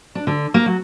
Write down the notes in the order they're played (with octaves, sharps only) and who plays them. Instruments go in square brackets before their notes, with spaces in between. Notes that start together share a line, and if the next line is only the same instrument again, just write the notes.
[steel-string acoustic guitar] D4
D3
A#3
F#3